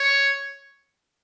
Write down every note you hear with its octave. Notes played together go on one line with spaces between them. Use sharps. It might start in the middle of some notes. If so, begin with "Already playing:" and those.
Already playing: C#5